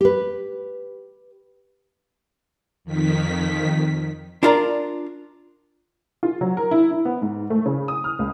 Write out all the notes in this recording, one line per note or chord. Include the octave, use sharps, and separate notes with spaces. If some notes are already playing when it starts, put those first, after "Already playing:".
G4 B4
F2 D#3 B6
D4 E4 F4 A#4 D5 A#5
F4
F#3
A#4
E4
E4
B3
G#2
A3
C#3
D#6
F6
C#2